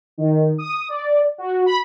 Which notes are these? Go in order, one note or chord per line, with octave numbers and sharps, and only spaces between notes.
D#3
D#6
D5
F#4
B5